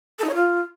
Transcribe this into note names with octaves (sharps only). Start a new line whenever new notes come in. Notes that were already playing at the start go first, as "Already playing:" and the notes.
A4
D#4
C#5
F4